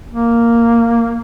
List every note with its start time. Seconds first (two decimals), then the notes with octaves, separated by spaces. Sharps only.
0.11 A#3